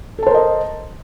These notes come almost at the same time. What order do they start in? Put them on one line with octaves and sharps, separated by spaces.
A4 A5 C5 A#4 D#5